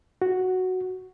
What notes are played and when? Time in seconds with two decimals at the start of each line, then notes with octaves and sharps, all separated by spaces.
0.22 F#4